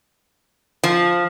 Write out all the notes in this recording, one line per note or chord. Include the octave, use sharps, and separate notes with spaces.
F3